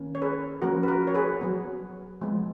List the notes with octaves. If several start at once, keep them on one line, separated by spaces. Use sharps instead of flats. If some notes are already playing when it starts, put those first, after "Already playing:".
Already playing: D#3 A#3 C#4
C#5
G#4 B4
F3 A#3 C#4 F#4 A#4
B4
F#4 A#4
C#5
G#4 B4
F#3 B3
F3 G#3 B3